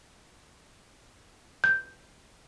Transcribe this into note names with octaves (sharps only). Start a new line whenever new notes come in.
G6